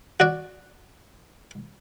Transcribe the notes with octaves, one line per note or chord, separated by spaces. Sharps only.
F#4 D5